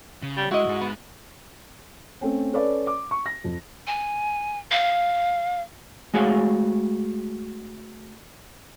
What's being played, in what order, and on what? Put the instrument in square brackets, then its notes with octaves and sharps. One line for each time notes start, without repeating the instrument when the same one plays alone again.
[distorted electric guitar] C#3
[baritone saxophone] G3
[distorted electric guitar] G#3 [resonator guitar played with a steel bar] E4 D#5 [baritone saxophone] F#4
[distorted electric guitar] G#2 G#3
[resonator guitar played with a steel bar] B3
[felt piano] A3 C4 C#4
C#4 A4 B4 C#5 D5
D6
C#6
A#6
F2
[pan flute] G#5
F5
[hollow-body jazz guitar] G#3 A3 F#4 G#4 C#5 F5